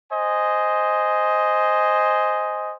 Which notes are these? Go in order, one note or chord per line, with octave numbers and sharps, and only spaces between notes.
C5 D#5 G#5